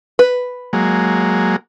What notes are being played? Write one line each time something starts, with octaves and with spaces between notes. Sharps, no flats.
B4
F#3 G#3 A#3